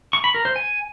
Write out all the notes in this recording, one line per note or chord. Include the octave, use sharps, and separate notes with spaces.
C#6
B5
A#4
C5
G#5